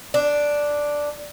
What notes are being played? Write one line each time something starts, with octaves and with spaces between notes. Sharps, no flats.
D4